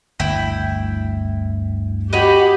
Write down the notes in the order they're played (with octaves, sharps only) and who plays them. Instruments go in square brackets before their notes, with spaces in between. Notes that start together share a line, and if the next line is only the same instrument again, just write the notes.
[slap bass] G1 D2 [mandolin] E4 G5
[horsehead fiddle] F#4 B5 [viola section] G4 [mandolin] C#5 D#5